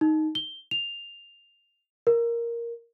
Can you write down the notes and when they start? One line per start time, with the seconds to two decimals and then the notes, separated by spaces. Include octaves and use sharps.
0.01 D#4
0.35 G7
0.71 F7
2.07 A#4